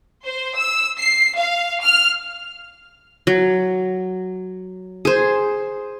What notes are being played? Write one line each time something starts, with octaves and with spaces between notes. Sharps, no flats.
C5
E6
C7
F5
F6
F#3
G#4 C5